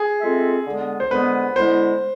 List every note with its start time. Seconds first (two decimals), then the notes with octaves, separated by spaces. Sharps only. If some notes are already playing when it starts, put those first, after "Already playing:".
Already playing: G#4
0.21 G#3 C4 F4 A4 E5
0.65 D3 G#3 B3
1.00 C5
1.11 D3 G#3 B3 B4
1.56 D3 G#3 B3 E4 C5